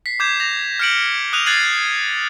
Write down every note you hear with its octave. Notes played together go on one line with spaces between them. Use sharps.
B6 C7
D6 G6 G#6 E7
A#6 F7
F6 G6 C#7 D7 F#7
D#6 F#6 D#7 F7
F#6 G#6 A6 C7 D#7 F#7